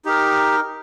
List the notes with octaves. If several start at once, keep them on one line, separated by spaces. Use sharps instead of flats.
D#4 G4 A#4